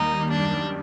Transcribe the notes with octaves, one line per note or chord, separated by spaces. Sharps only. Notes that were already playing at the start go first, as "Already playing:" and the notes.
Already playing: D#2 D#3 G3 A#3 D#4
F#2 D#3 G3 D4